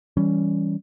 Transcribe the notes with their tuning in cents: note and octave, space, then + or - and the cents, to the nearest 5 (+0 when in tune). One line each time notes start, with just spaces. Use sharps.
E3 -10 G3 +0 C#4 +15